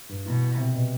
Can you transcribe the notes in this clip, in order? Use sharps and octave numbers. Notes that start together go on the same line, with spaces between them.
G2
B2 E3
G3
C3
B2